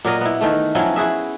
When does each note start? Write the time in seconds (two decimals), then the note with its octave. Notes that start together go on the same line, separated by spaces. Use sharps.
0.05 A#2 F#3 A#4 D#5
0.21 B3 E4
0.41 D#3 E3 A3
0.75 F3 F#3 C#4 E4
0.96 E4 F#4 G#4 E5